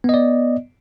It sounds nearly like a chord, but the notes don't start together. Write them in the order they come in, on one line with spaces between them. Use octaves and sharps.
B3 D#5 D5